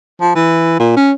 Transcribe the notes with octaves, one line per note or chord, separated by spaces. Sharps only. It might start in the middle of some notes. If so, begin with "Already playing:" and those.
F3
E3
A#2
C#4